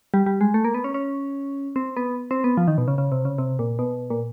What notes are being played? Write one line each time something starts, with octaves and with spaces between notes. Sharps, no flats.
G3
G3
G#3
A3
A#3
B3
C#4
C#4
C4
B3
C4
B3
F3
D#3
B2
C#3
C#3
C3
C#3
C3
A#2
B2
A#2